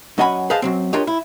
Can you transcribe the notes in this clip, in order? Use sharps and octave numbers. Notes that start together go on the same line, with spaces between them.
F#2 C#4 D#5 F#5 G#5 B5
G#4 B4 C5 D#5 F5 A5
F#2 F#3 C4
D4 F4 G4 A#4 C#5 D#5
E4